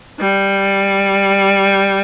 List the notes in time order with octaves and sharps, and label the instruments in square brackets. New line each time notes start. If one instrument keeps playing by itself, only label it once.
[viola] G3